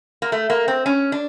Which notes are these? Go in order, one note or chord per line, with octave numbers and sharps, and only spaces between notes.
A#3
A3
A#3
C4
C#4
D4